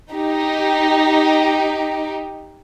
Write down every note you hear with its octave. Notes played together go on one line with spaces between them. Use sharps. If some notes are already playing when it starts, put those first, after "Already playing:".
D#4 G4